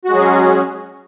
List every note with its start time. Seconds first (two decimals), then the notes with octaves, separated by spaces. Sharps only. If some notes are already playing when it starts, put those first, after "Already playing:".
0.05 F#4
0.09 G#3
0.13 F#3
0.17 G#4
0.21 C#4